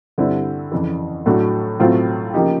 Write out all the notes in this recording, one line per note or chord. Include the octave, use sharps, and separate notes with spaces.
G2 D3 G3 C4 E4
F2 C#3 E3
A2 F#3 A3 D4 F#4
A2 F#3 A3 C4 F4
C#3 F3 A#3 D#4 G4